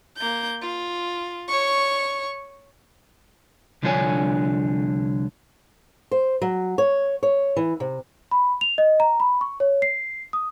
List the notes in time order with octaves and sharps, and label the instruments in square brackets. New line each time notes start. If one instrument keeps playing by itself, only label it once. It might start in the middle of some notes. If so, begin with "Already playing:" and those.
[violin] A#3 G6
F4
C#5 C#6
[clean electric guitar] C2 D3 F3 D4 C#5 G#5
[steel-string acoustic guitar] C5
F#3
C#5
C#5
E3
C3
[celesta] B5
F7
D#5
A#5
B5
C#6
C#5
C7
D#6